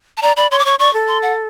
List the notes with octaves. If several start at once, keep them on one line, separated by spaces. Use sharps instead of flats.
A5
D5 A#5
D5 B5
C#5 C6
D6
C#5 C#6
D5 C#6
A4
C6
F#5